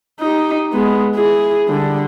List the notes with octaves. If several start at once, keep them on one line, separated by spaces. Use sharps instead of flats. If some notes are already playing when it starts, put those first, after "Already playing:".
D#4 G4
G#3 B3
E4 G#4
D3 G3